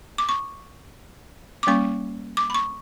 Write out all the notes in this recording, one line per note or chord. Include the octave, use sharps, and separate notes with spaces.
D6
C#6
D6
G3 A#3 C#4 C#6
D6
B5
C#6